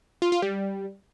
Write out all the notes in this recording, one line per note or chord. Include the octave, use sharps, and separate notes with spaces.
F4
F4
G3